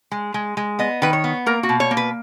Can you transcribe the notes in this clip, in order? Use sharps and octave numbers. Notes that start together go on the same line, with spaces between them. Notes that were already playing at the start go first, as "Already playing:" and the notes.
G#3
G#3
G#3
B3 D#5
D#3 B4
C#5
B3
A#3 A#4
F#4
B2
C#5
A#3
B4